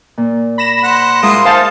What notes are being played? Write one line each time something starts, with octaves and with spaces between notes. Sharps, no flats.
A#2
B5 A#6 E7
C5 F#5 F#6
G#3 E4 F4 A#4 C5 D#6
D#4 G#4 C5 F5 A5